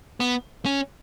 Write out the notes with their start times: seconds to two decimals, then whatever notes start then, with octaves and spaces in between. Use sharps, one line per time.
0.20 B3
0.65 C#4